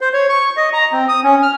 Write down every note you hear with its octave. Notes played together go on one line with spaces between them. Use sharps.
C5
C#5
C#6
D#5
A#5
C4
D#6
C#4
F6